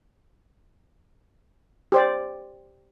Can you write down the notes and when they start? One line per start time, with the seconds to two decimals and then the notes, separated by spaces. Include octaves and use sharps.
1.92 G4 C5 D5